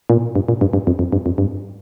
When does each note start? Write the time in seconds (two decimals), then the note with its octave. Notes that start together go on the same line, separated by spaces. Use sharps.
0.10 A#2
0.36 G2
0.48 A#2
0.61 G2
0.73 G2
0.87 F2
0.99 F2
1.12 G2
1.26 F2
1.38 G2